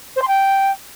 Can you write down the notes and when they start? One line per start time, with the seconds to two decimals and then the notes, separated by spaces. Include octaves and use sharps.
0.16 C5
0.21 C6
0.27 G5